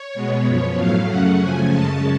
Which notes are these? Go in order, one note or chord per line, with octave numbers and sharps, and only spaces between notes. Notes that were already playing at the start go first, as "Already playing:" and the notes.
Already playing: C#5
B2 G#3 B3
F#2 F3 B3
A2 F#3 A3 F5
F#2 C#3 F#3 A3 C#4 F#5
C#3 F3 A3 C#4 G#5
F#2 C#3 G#3 C#4 A5